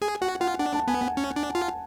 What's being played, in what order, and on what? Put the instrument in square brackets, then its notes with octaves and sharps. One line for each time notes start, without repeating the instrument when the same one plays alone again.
[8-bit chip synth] G#4 [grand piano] G#5
[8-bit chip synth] F#4 [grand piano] F#5
[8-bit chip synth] F4 [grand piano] F#5
[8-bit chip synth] D4 [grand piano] F#5
[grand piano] A5
[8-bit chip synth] B3 [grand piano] G#5
[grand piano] F#5
[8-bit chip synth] C#4
D4
F4